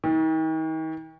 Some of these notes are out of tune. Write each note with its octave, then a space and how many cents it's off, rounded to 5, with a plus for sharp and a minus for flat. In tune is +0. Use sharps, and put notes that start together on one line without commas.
D#3 +40